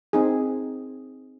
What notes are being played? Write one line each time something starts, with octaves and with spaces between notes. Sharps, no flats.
C4 D#4 G#4